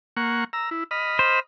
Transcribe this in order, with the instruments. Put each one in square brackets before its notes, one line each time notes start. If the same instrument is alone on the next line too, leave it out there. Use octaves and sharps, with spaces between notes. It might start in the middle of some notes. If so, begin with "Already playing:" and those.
[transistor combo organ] A#3 F#5 C#6
A#5 E6
E4
D#5 B5 F6
[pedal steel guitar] C5